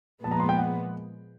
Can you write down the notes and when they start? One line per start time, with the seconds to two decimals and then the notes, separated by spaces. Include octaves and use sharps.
0.23 A#2 F3 G#3 B3 A5
0.31 A#5
0.40 C6
0.49 G5
0.57 F#5